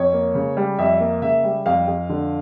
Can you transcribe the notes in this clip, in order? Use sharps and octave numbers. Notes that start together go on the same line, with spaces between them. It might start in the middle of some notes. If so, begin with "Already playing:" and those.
Already playing: F2 C#5
A#3
C#3
G3
F2 E5
A#3
C#3 E5
G3
F2 F5
F2
D3